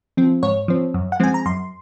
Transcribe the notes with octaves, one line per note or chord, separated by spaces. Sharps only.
F3 C4
G#2 C#5
F3 C4
F#2
F#5
F3 G#3 C4 G#5
A#5
F#2 C6